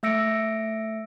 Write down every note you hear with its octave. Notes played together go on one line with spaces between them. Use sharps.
A3 E5 E6 A#6 C#7 D7